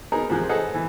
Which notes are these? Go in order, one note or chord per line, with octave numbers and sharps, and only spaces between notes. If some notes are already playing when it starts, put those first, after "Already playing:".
B3 D#4 G#4 A#4
G#2 C3 F3 G#3 F#6
G#4 A4 B4 C5 D#5 F#5
E3